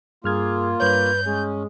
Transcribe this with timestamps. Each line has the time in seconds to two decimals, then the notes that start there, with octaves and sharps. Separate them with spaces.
0.24 G2 A#3 F4 G#4 F6 G#6
0.80 G2 B4 C#5 G6
1.25 G#3 C#4